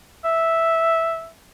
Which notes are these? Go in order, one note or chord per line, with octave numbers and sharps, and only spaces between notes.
E5